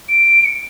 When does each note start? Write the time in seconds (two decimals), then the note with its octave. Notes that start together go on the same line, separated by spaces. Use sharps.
0.08 D7
0.44 C#7